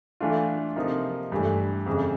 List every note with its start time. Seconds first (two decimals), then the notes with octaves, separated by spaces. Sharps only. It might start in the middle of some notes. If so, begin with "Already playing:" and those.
0.20 E3 A3 D4 F4
0.76 C3 F3 A#3 D#4
1.32 G2 E3 A3
1.86 F2 C#3 E3